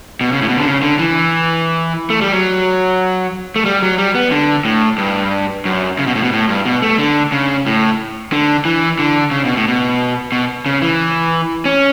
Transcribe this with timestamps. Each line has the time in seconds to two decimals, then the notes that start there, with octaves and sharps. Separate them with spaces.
0.21 B2
0.32 C#3
0.42 A2
0.49 B2
0.57 D3
0.65 C#3
0.82 D3
0.99 E3
2.10 A3
2.21 G3
2.32 F#3
3.56 A3
3.66 G3
3.82 F#3
3.98 G3
4.15 B3
4.31 D3
4.65 A2
4.98 G2
5.65 F#2
5.99 C#3
6.07 B2
6.15 A2
6.23 B2
6.32 A2
6.49 G2
6.65 B2
6.82 A3
6.98 D3
7.32 C#3
7.66 A2
8.32 D3
8.65 E3
8.99 D3
9.31 C#3
9.45 B2
9.57 A2
9.68 B2
10.32 B2
10.66 C#3
10.82 E3
11.65 C#4